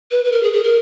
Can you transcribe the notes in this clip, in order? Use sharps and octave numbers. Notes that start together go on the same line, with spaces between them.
B4
B4
A#4
G#4
G#4
A#4